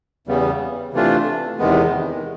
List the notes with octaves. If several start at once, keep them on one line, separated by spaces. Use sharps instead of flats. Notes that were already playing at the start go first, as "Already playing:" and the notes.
E2 C#3 E3 G3 B3
C3 E3 A3 D4 F4
E2 C3 D#3 G#3 B3